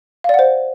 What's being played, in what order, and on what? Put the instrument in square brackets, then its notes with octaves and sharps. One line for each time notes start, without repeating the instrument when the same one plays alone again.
[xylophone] F5
D5
F#5
C5